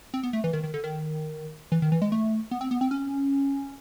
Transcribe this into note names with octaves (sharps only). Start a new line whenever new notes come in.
C4
B3
A3
E3
D#3
D#3
D3
D#3
E3
D#3
E3
G#3
A3
B3
C4
B3
C4
C#4